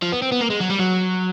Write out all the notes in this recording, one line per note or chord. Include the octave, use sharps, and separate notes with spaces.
F3
B3
C4
B3
A#3
G#3
F#3
G3
F#3